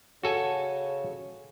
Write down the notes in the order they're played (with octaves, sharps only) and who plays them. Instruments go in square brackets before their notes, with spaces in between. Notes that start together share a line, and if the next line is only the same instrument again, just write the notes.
[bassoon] C#3 [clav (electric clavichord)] F#4 A4 G#5